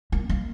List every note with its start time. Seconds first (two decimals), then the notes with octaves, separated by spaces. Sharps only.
0.12 A#3
0.29 A#3